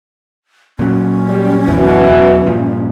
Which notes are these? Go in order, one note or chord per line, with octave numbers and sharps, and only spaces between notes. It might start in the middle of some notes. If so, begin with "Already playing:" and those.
A#2 F#3 C#4
G3
D1 F#2 B2 E3
E2 F#3
G2 A#2 F3